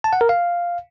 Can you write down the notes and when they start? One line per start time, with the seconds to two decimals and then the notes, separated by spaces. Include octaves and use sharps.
0.04 A5
0.13 F#5
0.21 A#4
0.29 F5